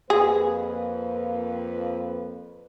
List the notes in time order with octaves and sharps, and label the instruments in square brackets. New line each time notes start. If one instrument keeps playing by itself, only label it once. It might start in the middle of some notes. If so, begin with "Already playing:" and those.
[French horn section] F2 A#3 B4 [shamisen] G#4